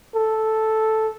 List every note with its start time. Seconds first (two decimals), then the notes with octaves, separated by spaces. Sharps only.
0.15 A4